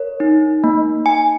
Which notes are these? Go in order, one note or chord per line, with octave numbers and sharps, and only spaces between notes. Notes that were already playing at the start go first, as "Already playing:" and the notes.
Already playing: A#4 C#5
D#4
A#3
G#5